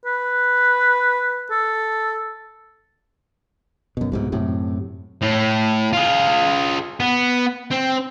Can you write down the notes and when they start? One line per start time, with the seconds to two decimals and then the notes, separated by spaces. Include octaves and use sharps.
0.06 B4
1.51 A4
3.97 F#2 B2
4.12 C2 G#2 B2
4.32 F#2 A2 C3
5.22 A2
5.93 F4 G#4
7.00 B3
7.71 C4